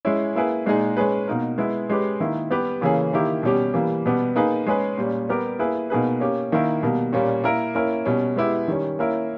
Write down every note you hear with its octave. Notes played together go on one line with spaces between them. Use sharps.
G#3 C#4 E4
A#3 E4 G#4 B4
A#2 G#3 D#4 G#4
G#3 C#4 G#4 B4
B2 A#3 D#4 A#4
G#3 B3 E4
G#3 C#4 G4 B4
D#3 A#3 E4
G3 B3 G4 B4
C#3 E3 A#3 C#4 G#4
D#3 A#3 E4 G4
B2 G3 C#4 G4
E3 G3 A#3
B2 G3 B3 G4
A#3 D#4 G#4 B4
G#3 C#4 G#4 B4
A#2 G3 C#4
G3 B3 G4 A#4
A#3 E4 G#4 B4
B2 A#3 D#4 G#4 B4
A#3 C#4 G4
D#3 A#3 E4 A#4
B2 G3 A#3
A#2 G3 A#3 C#4
A#3 E4 A#4
A#3 C#4 E4 A#4
B2 G3 C#4
G#3 B3 E4 G4
D#3 G3 C#4
A#3 C#4 E4 A#4